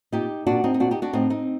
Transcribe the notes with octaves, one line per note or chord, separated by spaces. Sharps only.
A#2 D#4 G4
A#2 D4 F#4
C4 D#4
D#4
A#2 D4 F#4
D#4 G4
D4 F#4
A2 C4 D#4
C4 D#4